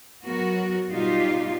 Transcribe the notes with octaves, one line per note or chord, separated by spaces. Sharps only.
F#3 B3 F#4 A#4
B2 G3 D#4 F4 G4